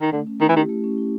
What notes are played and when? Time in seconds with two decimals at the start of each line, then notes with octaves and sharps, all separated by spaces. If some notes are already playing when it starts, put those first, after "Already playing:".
0.01 D#3
0.12 D3 A3
0.27 C#4
0.40 D#3 E4
0.49 E3
0.55 D#3 G4
0.69 A3
0.84 C#4
0.98 E4